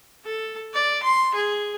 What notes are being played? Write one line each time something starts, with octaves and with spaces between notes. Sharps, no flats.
A4
D5
C6
G#4